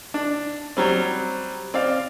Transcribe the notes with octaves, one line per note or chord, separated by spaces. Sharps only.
D4
F#3 G3 C4
C4 D5 F5